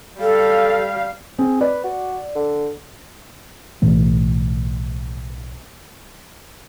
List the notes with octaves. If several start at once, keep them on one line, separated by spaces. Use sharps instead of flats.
G3 A4 F5
C4 G#4
B4 D5
F#4
D3
B1 A2 E3 A3